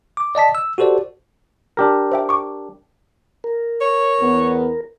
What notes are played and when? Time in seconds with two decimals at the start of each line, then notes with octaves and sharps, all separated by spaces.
0.17 D6
0.35 D5 D#5 A5 B6
0.55 E6
0.78 F#4 G4 A4 C5 D5
1.77 D4 G4 A#4
2.12 C5 E5 G5
2.29 C#6 D6
3.44 A#4
3.81 C#5
4.20 E2 B3